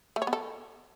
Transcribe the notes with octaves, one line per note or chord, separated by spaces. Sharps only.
A3
C#5
B3
A4